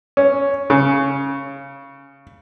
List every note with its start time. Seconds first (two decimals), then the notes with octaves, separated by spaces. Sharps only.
0.17 C#4
0.70 C#3